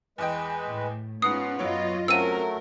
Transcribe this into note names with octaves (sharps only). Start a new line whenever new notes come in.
E2 G#3 B4 D#5 G5
A2
G#2 B3 C#4 F4 F#5 D#6 C7
F#2 F#3 F4 C#5 D#5
F#3 A3 C4 C#4 F#4 A#4 E6 D#7